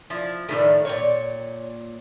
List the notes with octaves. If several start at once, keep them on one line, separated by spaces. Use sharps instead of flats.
F3 E4
A2 D#3 F3 G3 A3
A#2 B3 C#5 G5